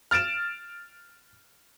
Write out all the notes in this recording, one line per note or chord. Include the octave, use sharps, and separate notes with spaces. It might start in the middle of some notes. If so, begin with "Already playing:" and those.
F6 A6 D7 E7